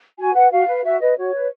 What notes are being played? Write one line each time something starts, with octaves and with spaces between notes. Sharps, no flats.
F#4 G#5
B4 F#5
F#4 F5
B4
F#4 E5
B4 D#5
F#4 C#5
B4